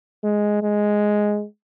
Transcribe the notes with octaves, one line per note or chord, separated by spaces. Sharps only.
G#3
G#3